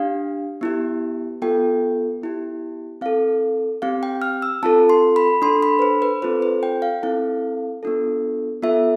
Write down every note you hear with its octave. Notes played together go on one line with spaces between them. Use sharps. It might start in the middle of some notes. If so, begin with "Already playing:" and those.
Already playing: D4 G4 F5
B3 E4 G4
B3 F4 A4 G5
B3 E4 G4
C4 E4 A4 F5
C4 G4 F5
G5
F6
E6
C4 F4 A4 A5
C6
B5
D4 A4 C6
B5
B4
C5
B4
C4 F4 A4 C5
C5
G5
F5
C4 E4 A4 F5
B3 D4 F4 A4
B3 F4 A4 E5